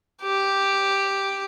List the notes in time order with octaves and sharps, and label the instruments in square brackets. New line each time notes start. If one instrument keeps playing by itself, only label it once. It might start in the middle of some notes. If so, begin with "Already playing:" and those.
[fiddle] G4